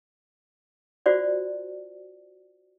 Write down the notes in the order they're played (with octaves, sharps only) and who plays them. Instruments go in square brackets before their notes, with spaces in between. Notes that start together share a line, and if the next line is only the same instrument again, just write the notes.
[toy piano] F4 F#4 C5 D5